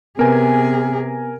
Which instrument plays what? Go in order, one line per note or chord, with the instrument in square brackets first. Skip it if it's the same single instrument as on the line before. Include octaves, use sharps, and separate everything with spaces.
[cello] C3 G#4 [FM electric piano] B3 [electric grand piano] A#4 G#5